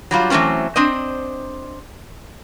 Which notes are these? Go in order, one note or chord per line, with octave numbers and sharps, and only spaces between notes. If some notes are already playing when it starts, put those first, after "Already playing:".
F#3 G3 F4
E3 F#3 A3 C4 C#4
C4 D4 C5 D#5